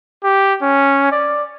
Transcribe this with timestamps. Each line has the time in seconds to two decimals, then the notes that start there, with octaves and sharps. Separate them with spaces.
0.23 G4
0.62 C#4
1.12 D5